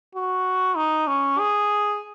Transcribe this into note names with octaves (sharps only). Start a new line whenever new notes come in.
F#4
D#4
C#4
G#4